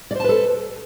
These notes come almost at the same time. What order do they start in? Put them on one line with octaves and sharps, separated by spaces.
D5 C5 A5 B4 A4